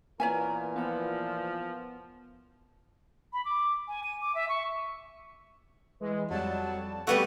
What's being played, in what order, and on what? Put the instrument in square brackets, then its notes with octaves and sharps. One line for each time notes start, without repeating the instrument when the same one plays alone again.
[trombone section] A#2 E3 [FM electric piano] A#3 B3 [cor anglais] A#4 [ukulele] C#5 E5 G#5
[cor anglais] F3 [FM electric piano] B3 F#5
[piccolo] B5
D6
G#5
D#7
D6
E5
C#6
[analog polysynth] E3 G#3
[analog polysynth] F2 G3 A5 [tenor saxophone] F#3
[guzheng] G3 B3 F#4 [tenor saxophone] A3